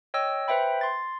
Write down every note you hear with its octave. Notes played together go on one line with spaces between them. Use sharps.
C#5 D#5 G5 E6
B4 C5 E5 G5 B5
C6 A6